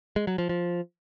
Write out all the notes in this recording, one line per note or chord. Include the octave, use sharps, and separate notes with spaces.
G#3
F#3
F3
F3